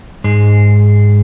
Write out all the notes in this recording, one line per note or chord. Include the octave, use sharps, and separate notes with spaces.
G#2 G#3